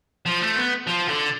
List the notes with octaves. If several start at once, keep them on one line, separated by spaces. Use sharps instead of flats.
F3
A3
B3
F3
D3